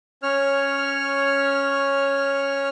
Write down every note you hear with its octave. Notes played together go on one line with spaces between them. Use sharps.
C#4 C#5 F6